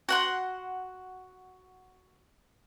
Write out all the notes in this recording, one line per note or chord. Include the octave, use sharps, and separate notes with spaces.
F#4 F#5 C6